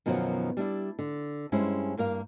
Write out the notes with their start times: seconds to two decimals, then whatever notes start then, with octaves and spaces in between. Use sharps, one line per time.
0.06 F#2 B2 D#3 F3 F#3
0.57 G3 D4 E4
0.99 D3
1.52 G2 G#3 C#4 E4 C5
1.97 G2 A#3 A#4 F5